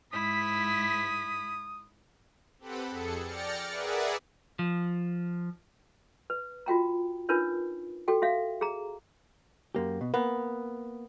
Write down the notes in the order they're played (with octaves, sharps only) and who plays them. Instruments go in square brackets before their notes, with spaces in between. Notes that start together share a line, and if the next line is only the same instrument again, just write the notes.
[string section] G#2 B6 [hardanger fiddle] E4 [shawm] D#6
[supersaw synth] C4 G4 A4 B4 F#5 B5
F2 G#4 A4 C#7
D5 G5 F6 A6 A#6 C#7
G#4 A#4 B4 D5 E5 F#5
[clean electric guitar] F3
[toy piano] B4
F4 F#4 G5 A#5
D4 D#4 F4 A#4 B4 C#5
F#4 A4 G5
F#4 E5 F5
G#4 A#5
[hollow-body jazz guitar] F#2 A#3 G4
B2
[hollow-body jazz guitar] A#3 [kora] B3